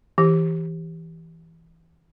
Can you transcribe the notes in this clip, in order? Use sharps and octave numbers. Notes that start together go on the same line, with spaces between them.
E3 G4